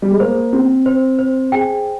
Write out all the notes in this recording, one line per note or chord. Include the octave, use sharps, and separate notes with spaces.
G3
G#3
A#3 C5
C4 C5
C5
C5
G#4 G5